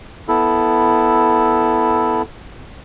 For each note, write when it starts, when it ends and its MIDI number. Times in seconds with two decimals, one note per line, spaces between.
0.28 2.22 59
0.28 2.22 64
0.28 2.22 69